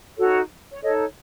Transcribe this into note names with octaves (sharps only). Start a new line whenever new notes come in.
D#4 F#4 A4 C#5
C#5
D#4 A4 C#5 D#5